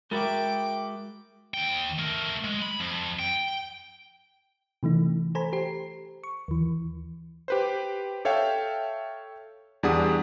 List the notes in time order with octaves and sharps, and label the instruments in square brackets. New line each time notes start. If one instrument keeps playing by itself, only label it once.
[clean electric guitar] G#3 F#4 E5 [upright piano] A#4 B5 A6 [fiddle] G5 D6
[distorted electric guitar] D#2 G5
A3 A#4
G#3
B5
F2
G5
[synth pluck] C3 E3 A3 D#4
A4 C5 G#5 A#5 B5
G4 C5 C7
C#6
D#2 E3
[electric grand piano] G4 B4 C5
A4 C#5 E5 F5 G5
E2 G3 D4 G#4 F#5 D#6